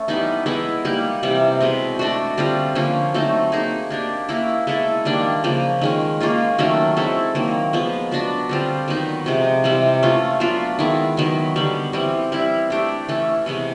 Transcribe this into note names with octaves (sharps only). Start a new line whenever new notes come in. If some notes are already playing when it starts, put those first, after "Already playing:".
Already playing: A3 C#4
E3 G3 B3 D#4
E3 G#3 B3 E4
G3 A#3 D#4
C3 E3 G3
B2 G#3 C4
A3 D4 F#4
D3 G3 C4 F4
D3 F3 A#3 C#4
F#3 A3 C4 D#4
A#3 D#4 G#4
A#3 D4 G4
A#3 C#4 E4
G#3 B3 E4 A4
D#3 G3 A#3 D4
C#3 F3 A#3
D#3 G#3 C#4
A#3 C#4 F4 G#4
D#3 F#3 A3 C#4
G#3 C4 E4 A4
D#3 F#3 A#3
F3 G#3 B3
F#3 B3 D4 F#4
D3 G3 C4 F4
D#3 F#3 B3 D#4
C3 F3 G#3
C3 E3 G3
A3 C#4 F4
F#3 B3 D4 F4
D#3 G#3 B3 E4
D#3 F#3 B3
D3 G3 B3
E3 G3 C4
G3 C4 E4
A3 D4 G4
E3 A3 C#4
C3 E3 G#3 B3